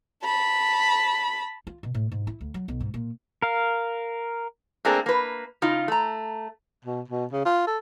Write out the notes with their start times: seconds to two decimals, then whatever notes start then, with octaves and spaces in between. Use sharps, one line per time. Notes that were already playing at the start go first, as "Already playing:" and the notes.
0.24 A5 B5
1.67 F4
1.83 B2
1.94 A2
2.11 G#2
2.27 E4
2.41 D2
2.54 F#3
2.68 B1
2.80 G#2
2.94 A#2
3.42 A#4 F5
4.85 A3 A#3 C4 D4 G#4 A#4
5.06 A#3 B4
5.62 C#3 D#4 F4
5.88 A3 A#5
6.85 B2
7.08 B2
7.32 C#3
7.45 F4
7.67 A4